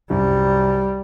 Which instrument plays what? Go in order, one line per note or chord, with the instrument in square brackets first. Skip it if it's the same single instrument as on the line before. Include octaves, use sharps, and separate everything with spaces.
[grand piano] C2 F#2 [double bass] G3